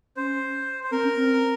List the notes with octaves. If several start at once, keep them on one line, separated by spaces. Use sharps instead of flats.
C#4 C5
C5
C4 A#4
C#4
C4